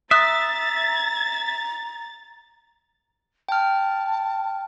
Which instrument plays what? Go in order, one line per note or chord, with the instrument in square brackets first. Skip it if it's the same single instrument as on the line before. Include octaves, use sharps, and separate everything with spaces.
[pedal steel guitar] E5 [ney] A#5 [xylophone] D#6 F#6 [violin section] A6
[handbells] G5 F6 [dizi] A5